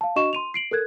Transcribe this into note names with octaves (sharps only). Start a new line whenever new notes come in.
F5 A5
D4 F#4 D#5 C#6 E7
C6 D#7 F7
C7 D7 F#7
A4 A#4 F#6 G#6